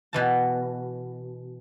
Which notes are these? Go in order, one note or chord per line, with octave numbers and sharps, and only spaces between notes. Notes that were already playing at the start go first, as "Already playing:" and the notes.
B2 E3 A5